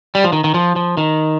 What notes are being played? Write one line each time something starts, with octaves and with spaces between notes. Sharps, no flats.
G3
F3
D#3
D#3
F3
F3
D#3